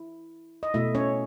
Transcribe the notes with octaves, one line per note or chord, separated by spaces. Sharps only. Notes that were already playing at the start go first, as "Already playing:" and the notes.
Already playing: E4
D#5
B2 A3 E4 E5
C#4 C#5